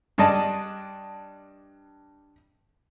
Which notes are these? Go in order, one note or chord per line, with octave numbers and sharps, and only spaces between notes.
G2 D4 D#5 A5